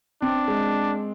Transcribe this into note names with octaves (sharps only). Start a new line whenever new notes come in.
C4 D4
G#3